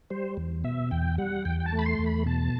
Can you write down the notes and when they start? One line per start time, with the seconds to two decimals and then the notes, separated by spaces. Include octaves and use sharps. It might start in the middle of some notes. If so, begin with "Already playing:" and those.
0.10 G3 C5
0.37 E2
0.64 B2 E5
0.91 E2 G5
1.18 G3 F#5
1.45 E2 G5
1.60 G5
1.66 A5
1.72 A3
1.78 B5
1.86 C6
1.99 E2
2.06 B5
2.26 B2 A5